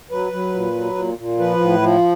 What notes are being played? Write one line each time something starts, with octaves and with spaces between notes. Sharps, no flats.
F#3 B4
F#3
A#2
F#3
A#2
A#2
F3 B4
A2
F3